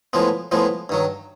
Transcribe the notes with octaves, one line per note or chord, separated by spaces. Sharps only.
A2 F3 G#3 B3
A2 F3 G#3 B3
G2 D#3 F#3